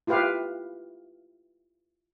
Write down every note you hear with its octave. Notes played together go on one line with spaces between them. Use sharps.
E4 F4 G4 B4 F5